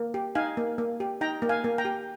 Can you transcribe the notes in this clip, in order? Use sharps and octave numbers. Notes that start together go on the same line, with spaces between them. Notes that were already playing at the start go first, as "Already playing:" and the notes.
Already playing: A#3
G4
D#4 F5 G#5
A#3
A#3
G4
D#4 G5 A#5
A#3
F5 G#5
A#3
G5 A#5
G4